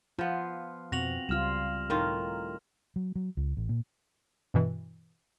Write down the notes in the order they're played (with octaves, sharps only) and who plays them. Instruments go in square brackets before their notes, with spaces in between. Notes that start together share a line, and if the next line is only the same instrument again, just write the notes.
[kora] F3 B3 [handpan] F4
[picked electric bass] F2 B2 [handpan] C4 [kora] F#4 [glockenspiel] A#6 F7 F#7
[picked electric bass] C#2 [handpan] G3 F4 [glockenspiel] F6 E7
[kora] A2 D#3 F4 [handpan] A#4
[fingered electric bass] F#3
F#3
C#2
A1
A#2
[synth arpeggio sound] G2 B2 E3